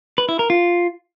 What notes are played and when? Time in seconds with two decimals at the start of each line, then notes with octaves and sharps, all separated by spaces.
0.18 B4
0.29 E4
0.39 A#4
0.50 F4